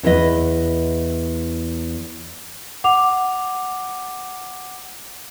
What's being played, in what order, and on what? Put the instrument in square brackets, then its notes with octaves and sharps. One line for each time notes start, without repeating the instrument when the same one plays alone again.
[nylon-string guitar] E2 E4 B4 D#5
[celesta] F#5 D6 F7